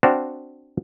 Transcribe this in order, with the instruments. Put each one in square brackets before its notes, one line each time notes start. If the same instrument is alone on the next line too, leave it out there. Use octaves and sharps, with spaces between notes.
[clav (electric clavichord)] C4 D4 F#4 C5 F5 G5